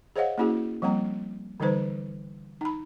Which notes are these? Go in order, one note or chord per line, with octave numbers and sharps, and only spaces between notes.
G#4 C5 C#5 D#5 F5 F#5
A#3 C#4 E4 F#4 G#4
F3 G3 A#3 C4 A#5
D3 E3 G3 D#4 B4 C5
D#4 B5